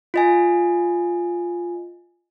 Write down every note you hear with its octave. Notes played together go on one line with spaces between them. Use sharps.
F4 D#5 G#5